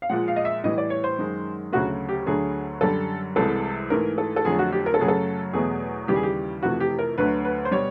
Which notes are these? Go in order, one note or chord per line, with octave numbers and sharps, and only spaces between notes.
F5
A#2 F3 G#3 F#5
F5
D#5
E5
A2 E3 G3 D#5
D5
C#5
C5
F#2 D#3 G#3
D2 C#3 F#3 A3 F#4
G4
D2 D3 F#3 A3 G#4
F#2 D3 G3 A4
C2 C3 E3 G#3 A4
G#2 E3 A3 A#4
A4
A4
F2 D3 F#3 A3 G#4
F#4
G4
A#4
A4
F#2 C#3 F#3 A3 G#4
A4
E2 B2 F#3 A3 G#4
D#2 C#3 E3 G3 G4
G#4
G4
F2 C3 E3 A3 F#4
G4
A#4
D2 D3 F#3 A3 B4
B4
C5
B2 G3 C#5